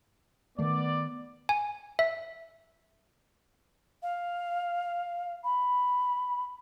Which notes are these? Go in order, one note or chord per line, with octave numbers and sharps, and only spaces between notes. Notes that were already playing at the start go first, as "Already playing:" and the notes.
D#3 A3 B3 D5
G#5
E5
F5
B5